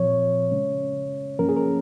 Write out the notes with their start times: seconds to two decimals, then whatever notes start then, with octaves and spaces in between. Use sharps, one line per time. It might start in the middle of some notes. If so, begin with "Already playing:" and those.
Already playing: A#2 F3 C4 C#5
0.51 C#3 G#3 C#4
1.38 G2 F3 A#3 C#4 A#4
1.49 G#4
1.57 A#4